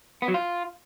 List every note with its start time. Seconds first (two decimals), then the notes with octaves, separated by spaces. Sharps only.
0.22 B3
0.28 F#3
0.34 F4